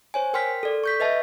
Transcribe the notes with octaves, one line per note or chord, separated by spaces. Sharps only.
C5 C#5 G#5
A#4 G5 C6 F6 B6
A4 D5
C#6 G6 B6
B4 D#5 E5 A5